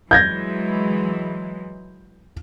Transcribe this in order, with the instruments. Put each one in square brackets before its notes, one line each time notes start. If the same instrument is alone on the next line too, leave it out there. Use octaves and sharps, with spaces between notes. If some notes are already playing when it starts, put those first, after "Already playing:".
[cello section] E3 F#3 G#3 [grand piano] G6 G#6 A#6